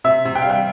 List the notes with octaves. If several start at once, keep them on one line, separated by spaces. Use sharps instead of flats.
C3 E5
C3
G5
F5
G3 G5